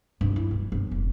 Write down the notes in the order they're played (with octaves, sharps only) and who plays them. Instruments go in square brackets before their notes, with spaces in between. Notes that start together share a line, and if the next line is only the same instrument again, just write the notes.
[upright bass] G2
E4
F#1
G1
F1